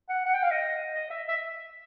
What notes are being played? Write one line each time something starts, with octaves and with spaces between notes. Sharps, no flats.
F#5
F#5
G5
F5
D#5
D#5
E5
E5